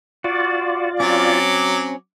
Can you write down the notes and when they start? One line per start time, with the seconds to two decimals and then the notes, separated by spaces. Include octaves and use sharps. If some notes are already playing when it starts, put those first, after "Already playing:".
0.24 F4 F#4 D5
1.00 F#3 C4 C#4 D6